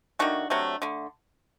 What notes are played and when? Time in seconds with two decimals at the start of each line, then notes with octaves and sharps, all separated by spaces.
0.19 D#3 A3 D4 F#4
0.50 C3 F#3 A3
0.82 D3 A3